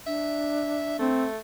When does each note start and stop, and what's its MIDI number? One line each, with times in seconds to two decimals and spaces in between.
0.07 1.09 62
0.07 0.99 76
0.99 1.38 57
0.99 1.26 60